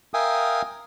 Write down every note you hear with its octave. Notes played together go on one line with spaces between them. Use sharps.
A#4 E5 F5 G5 G#5 D#6